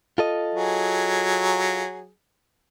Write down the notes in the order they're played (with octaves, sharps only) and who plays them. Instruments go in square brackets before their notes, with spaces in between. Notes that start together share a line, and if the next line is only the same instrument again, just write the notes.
[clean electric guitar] F4 A4 D#5
[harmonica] F#3 G#4